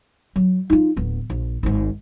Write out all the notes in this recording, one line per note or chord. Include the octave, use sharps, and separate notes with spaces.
F#3
D#4 F4
D1 B3
A#1
G#1 G#2